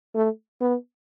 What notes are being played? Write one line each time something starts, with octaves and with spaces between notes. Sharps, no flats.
A3
B3